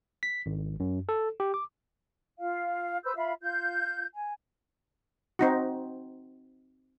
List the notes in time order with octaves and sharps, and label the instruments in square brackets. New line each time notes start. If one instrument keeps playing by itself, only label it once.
[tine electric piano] B6
G#1
F#2
A4
G4
D6
[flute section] F4 F5
B4 C5 E6 G6
F4 E5 F5 B5
F4 G6
G#5
[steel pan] C4 D#4 F#4